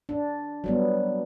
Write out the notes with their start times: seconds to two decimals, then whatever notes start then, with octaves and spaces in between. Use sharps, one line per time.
0.09 D4
0.64 F#3 G3 B3